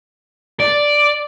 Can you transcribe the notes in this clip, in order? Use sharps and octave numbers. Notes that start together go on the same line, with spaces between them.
D5